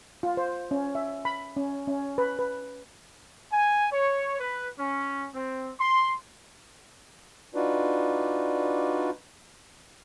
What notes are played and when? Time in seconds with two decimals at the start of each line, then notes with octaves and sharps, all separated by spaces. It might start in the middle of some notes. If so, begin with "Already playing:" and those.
0.23 F4
0.37 C5
0.71 C#4
0.95 E5
1.25 B5
1.57 C#4
1.87 C#4
2.18 B4
2.39 B4
3.52 G#5
3.92 C#5
4.39 B4
4.79 C#4
5.34 C4
5.80 C6
7.55 D4 D#4 F4 F#4 B4 D5